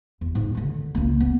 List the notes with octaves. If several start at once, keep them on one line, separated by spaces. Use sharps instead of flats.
E2
G#2
D3 D#3
C#2 A#3
B3